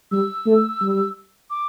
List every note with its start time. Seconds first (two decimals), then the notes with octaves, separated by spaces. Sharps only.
0.12 G3 E6
0.46 A3
0.81 G3
1.50 D6